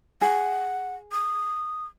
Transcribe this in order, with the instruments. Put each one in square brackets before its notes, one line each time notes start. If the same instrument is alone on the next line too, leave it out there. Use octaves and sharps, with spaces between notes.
[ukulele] G#4 [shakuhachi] F#5
[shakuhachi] D#6